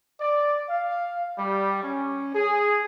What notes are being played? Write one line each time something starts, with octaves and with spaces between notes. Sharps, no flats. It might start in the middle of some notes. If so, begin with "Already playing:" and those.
D5
F5
G3
C#4
G#4